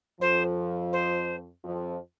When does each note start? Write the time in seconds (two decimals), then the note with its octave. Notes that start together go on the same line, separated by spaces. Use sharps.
0.21 F2 F3 C5
0.92 C5
1.64 F2 F3